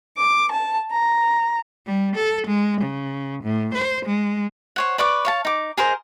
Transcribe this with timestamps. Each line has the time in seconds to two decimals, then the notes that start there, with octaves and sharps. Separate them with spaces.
0.16 D6
0.51 A5
0.91 A#5
1.87 G3
2.16 A4
2.47 G#3
2.81 C#3
3.44 A2
3.74 C5
4.06 G#3
4.76 C5 C#5 F#5
4.98 B4 D5 C#6 D6
5.25 C#5 F5 A5
5.45 D#4 D6
5.77 G#4 A#4 C5 D#5